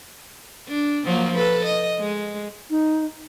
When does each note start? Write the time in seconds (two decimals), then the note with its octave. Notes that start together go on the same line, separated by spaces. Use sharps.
0.68 D4
1.05 F3 F#3 A#3
1.35 A4 B4
1.64 D#5
2.00 G#3
2.70 D#4